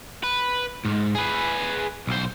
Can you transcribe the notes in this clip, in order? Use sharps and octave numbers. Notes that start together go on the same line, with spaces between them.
B4
G#2
G#4 B4
B1 C5